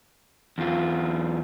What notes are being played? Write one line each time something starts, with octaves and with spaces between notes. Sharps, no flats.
E2 F4